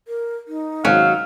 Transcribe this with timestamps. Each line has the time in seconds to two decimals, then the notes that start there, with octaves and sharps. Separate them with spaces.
0.08 A#4
0.48 D#4
0.85 G#1 F#3 C#4 F5